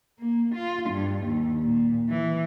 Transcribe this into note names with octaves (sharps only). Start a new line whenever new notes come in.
A#3
F4
G2
D#2
A#2
E3